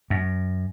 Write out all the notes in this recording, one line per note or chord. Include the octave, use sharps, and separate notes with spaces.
F#2